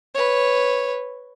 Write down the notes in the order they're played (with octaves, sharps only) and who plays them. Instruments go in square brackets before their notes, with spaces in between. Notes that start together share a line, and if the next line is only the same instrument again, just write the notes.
[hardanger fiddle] B4 C#5